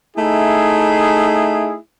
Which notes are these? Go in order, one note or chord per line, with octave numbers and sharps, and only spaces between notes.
A3 D#4 E4 G#4